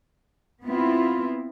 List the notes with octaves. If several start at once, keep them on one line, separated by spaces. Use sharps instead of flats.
B3 C4 E4 F4